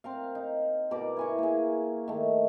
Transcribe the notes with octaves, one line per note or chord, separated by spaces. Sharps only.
C4 A#4 F5
D#4
B2 A#4 D5 D6
E4 G#5 C#6
A#3 G#4
D#3 A3